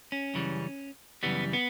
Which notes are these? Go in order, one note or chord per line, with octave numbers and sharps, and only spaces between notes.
C#4
F#2 C#3 E3 G3
F#2 C#3 E3 G3 B3
B3